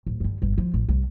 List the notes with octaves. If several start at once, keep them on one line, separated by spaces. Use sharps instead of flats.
D1
G2 D3
G1
F3
A1
C2